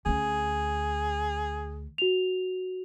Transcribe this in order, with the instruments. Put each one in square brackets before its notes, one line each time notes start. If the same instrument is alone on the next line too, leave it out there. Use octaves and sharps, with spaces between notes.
[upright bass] D2 C#4 [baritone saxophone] G#4
[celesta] F#4 F7